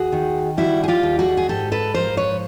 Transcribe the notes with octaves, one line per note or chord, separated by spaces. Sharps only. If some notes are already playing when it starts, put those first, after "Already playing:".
Already playing: D#2 F#4 G#4
D#3
G3 E4 F#4
G#4
F4 G4
D#2
F#4 G#4
G#4
G#2 G4 A4
A4 B4
F3 A#4 C5
B4 C#5